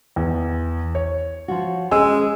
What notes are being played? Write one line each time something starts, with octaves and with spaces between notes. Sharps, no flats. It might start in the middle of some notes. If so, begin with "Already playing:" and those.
E2
C#5
F3 F4 F#4
G#3 C#4 G#4 E6